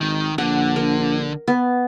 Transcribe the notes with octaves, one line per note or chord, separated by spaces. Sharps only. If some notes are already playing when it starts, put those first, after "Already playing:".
G#1 D#3
A#1 D3 F#5
A#4
B3